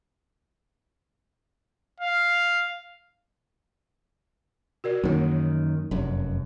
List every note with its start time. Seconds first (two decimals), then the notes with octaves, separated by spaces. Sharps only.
2.00 F5
4.84 F#4 A#4 D5
5.04 F#2 D#3 E3 G3 A#3
5.91 F1 F#2